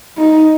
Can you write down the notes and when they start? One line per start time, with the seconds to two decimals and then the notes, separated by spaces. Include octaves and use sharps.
0.17 D#4